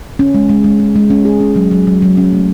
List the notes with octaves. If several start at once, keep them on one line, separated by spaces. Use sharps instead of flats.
C#4
G#3
G#3
G#3
G#3
G#3
C#4
G#4
C#4
F#3
F#3
F#3
F#3
C#4
A3